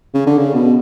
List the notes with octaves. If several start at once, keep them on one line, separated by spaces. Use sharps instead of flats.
C#3
D3
C#3
B2